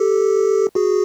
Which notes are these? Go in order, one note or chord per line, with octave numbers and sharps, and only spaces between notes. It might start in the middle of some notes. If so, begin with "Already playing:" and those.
Already playing: G4 A4
F#4 G#4